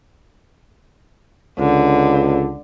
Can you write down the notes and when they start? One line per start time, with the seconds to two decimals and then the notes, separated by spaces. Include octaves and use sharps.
1.59 C#2 D3